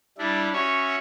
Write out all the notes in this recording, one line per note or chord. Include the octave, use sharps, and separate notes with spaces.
G3 D4 E4
C#4 F#4 C#5 E5